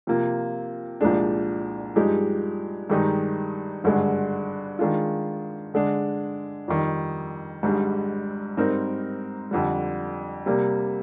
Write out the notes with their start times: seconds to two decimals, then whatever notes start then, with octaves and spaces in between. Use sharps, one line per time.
0.07 C3 F3 A#3 F4
1.01 C2 A#2 F3 G#3 D4
1.96 G2 F3 G#3 D#4 G4
2.90 G2 D#3 G#3 D#4 G4
3.84 G#1 G2 D3 G#3
4.79 D#3 G#3 D4 F4
5.74 D3 G#3 D4
6.68 F2 D#3 G3
7.63 G#1 G#2 G3 D4 G#4
8.57 G#2 G3 C4 D#4 A#4
9.51 F2 D3 G3
10.46 C3 G3 A#3